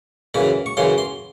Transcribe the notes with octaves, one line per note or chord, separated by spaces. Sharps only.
F#2 C#3 E3 B5
C#6
F#2 C#3 E3 C6
C6